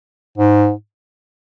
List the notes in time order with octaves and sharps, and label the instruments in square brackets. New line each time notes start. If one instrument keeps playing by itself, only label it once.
[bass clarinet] G#2